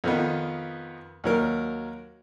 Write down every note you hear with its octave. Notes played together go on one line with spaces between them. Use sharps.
F2 D#3 B3
D#2 F#3 A#4